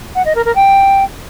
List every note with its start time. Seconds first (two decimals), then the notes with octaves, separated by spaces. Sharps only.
0.15 F#5
0.25 D#5
0.35 A#4
0.45 A#4
0.55 G5